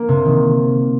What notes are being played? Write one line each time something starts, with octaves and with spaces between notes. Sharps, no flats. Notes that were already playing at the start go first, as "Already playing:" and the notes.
Already playing: A#3
C3
D#3